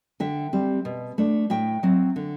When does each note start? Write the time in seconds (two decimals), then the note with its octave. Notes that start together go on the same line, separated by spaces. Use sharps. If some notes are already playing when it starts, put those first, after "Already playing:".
0.20 D3 E5 G5
0.53 G3 C4
0.85 B2
1.18 A3 D4
1.50 A2 E5 G5
1.83 F#3 C4
2.16 D3